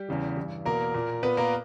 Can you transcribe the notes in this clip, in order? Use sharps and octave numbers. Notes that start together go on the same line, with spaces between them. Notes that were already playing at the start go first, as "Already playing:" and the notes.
Already playing: G3 G4
E2 C#3 E3
G2 E3
E2 B2 A#3 A#4
A#2
A#2 B3 B4
A#3 A#4